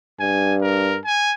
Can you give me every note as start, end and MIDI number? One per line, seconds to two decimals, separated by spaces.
0.20 0.98 43
0.20 0.56 80
0.62 1.00 70
1.05 1.34 80